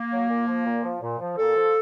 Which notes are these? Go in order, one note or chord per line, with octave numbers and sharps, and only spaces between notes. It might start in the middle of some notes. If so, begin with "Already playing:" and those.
Already playing: A#3
F#3
A#2
F3
A#2
F3
A#2
F3
A#2 A4
F3